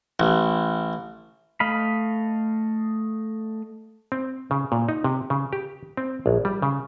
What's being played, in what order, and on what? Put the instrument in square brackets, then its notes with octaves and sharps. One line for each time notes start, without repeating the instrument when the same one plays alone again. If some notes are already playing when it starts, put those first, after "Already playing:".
[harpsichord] A1
[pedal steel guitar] A3 D#5 F5 B5
[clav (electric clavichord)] C4
C#3
A#2
D#4
C3
C#3
G4
C4
A#1
G3
C#3